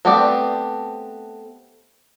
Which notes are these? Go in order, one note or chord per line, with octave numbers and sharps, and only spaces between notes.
A3 B3 C4 G4 D5